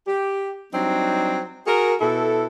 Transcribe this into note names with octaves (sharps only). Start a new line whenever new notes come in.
G4
F#3 G3 C4 D4 D#4
F#4 G#4 A#4
B2 E4 A4